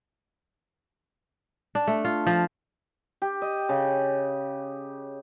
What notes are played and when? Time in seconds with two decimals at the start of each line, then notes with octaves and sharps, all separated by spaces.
1.75 D4
1.87 A3
2.05 F4
2.27 F3
3.22 G4
3.42 D#5
3.69 C#3